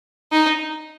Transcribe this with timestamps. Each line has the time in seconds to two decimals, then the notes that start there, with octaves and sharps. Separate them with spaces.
0.32 D#4